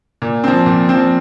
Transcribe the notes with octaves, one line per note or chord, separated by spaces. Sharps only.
A#2
F3 C4
A#2
F3 C4